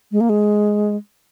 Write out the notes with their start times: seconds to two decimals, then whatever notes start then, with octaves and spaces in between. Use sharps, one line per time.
0.12 G#3
0.21 A#3
0.29 G#3